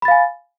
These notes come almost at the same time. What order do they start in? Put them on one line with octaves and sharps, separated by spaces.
B5 A6 F5 G#5